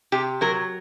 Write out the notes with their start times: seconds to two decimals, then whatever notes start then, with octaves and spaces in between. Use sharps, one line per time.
0.12 C3 G4
0.41 F#3 A#4